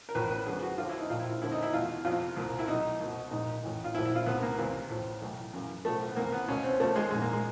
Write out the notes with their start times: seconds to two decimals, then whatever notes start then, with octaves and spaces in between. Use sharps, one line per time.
0.09 A#4
0.15 A1 A2 F3 B4
0.31 B4
0.46 F#2 D3 F3 G#4
0.63 F#4
0.78 D#2 D3 F3 F4
0.89 E4
0.99 D#4
1.10 A#1 A2 F3 F4
1.20 E4
1.31 F4
1.42 D#2 D3 F3 E4
1.52 D#4
1.63 E4
1.73 E2 B2 F4
2.05 F2 C3 F3 F4
2.36 C2 A#2 F3
2.59 E4
2.67 B1 B2 D#4
3.00 C2 B2
3.31 A#1 G#2 D#3 D#4
3.63 A1 A2 E3
3.84 F4
3.95 A#1 G#2 F3 E4
4.06 E4
4.15 F4
4.26 C2 C3 D#3 B3
4.42 A#3
4.58 C#2 C3 E3
4.90 A1 A2 F3
5.21 B1 A2 E3
5.53 F#2 C#3 E3
5.85 B1 A2 F3 A3
6.09 B3
6.16 C2 C3 E3 A#3
6.32 B3
6.48 C#2 B2 C#4
6.64 C4
6.80 D#2 C#3 F3 A3
6.96 G#3
7.11 A#1 G#2 E3 G#3
7.22 A#3
7.33 G#3